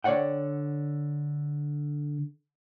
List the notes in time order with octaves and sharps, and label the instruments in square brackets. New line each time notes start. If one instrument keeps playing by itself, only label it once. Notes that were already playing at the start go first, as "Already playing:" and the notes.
[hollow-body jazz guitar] D3 C#5 D5 F#5 G5